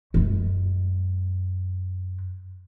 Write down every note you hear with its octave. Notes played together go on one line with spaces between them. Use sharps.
F#2 G#3